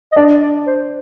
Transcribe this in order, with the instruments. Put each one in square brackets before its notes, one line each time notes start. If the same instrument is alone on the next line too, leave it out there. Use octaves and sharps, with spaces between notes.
[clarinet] D#5
[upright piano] D4 [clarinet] D5
[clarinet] D5
C5